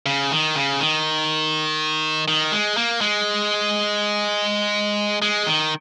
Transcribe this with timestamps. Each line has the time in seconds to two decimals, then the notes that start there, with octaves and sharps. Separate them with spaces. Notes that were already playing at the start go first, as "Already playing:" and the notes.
0.06 C#3
0.31 D#3
0.55 C#3
0.80 D#3
2.28 D#3
2.52 G#3
2.77 A#3
3.01 G#3
5.22 G#3
5.46 D#3